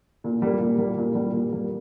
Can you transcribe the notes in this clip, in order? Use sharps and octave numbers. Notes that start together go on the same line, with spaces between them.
A#2
G3 A#3
A#2
G3 A#3
A#2
G3 A#3
A#2
G3 A#3